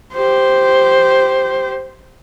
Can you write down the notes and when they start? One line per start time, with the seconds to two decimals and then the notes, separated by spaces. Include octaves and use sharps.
0.13 G4 C5